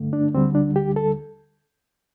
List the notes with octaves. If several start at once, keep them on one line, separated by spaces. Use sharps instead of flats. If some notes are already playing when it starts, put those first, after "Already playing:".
Already playing: G2 D3 A3
D4
D2 D3 G3 C4
D4
G4
A4